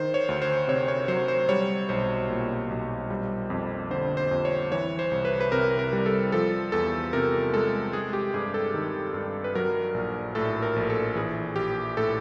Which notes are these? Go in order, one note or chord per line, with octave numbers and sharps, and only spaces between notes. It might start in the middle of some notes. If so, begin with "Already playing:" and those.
Already playing: D#3 C5
C#5
D2
C5
C3 C#5
C#5
F#3 C5
C5
G3 C#5
B1 C5
A#2
B1
G3
F2
D3 C5
C5
F2
C#5
E3 C#5
C5
C2
B4
B4
C3 A#4
A#4
G3
A4
F3 A4
E2 A4
C3 A#4
G#3 A4
G#3 G#4
G4
G2 G#4
A4
D#3
G2
B4
F#3 A#4
A#1
A2 A4
A#4
A#1
A4
E3 G#4
A#1 G4
A2 A4